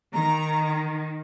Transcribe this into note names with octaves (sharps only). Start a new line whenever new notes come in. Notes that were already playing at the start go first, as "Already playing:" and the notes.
D#3 A#5